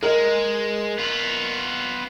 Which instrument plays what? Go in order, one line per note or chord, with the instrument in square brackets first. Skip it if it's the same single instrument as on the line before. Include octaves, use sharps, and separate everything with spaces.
[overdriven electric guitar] G#3 [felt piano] A#4 D#5
[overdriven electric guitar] B3 F4